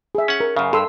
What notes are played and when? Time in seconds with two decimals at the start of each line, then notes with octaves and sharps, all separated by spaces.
0.15 G#4 E5
0.28 C#4 F#5
0.40 A#4
0.57 F#2 C#3 F5
0.73 G2 A4 C6 E6